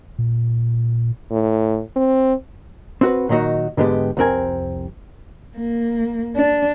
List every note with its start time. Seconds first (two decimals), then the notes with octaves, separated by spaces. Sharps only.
0.19 A#2
1.31 A2
1.96 C4
3.01 C4 F#4 B4
3.29 A#2 D#3 F#3 D#4 F#4
3.77 G#2 D3 G#3 B3 G4
4.17 C2 F2 C4 A#4 G#5
5.58 A#3
6.36 D4